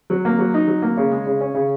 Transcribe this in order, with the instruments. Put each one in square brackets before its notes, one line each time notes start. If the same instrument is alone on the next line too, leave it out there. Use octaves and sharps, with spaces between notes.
[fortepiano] F#3
A#3
F#3
D#4
F#3
A#3
C#3
G#3
C#3
C#4
C#3